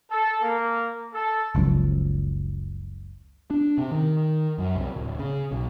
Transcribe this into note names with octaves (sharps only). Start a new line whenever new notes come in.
A4
A#3
A4
F#1 C#2 F#2 F3
D4
C3
D#3
F#2
C2
D1
C#3
B1